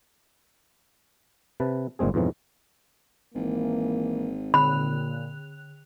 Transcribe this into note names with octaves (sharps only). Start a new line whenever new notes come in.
C3 B4 A5
G1 A#2 G#3 C4 G#4
F2 G#2 B2 E3 F#3
G#1 E3 A#3
A#2 D3 B5 F#6 F7